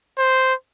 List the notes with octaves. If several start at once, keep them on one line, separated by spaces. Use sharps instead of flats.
C5